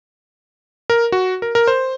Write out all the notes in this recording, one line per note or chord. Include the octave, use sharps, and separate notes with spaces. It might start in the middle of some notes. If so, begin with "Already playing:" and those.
A#4
F#4
A#4
A#4
C5